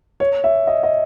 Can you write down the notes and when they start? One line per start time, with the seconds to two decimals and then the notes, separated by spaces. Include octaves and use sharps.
0.20 C#5
0.44 E5
0.67 D#5
0.83 D#5